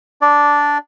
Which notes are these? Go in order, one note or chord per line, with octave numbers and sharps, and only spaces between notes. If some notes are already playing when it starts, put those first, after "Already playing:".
D4 D5